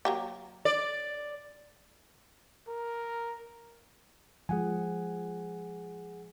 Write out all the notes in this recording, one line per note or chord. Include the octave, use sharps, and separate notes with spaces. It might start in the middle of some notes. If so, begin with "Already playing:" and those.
F#3 A#3 G4
D5
A#4
F3 G#3 G#4 F#5 G#5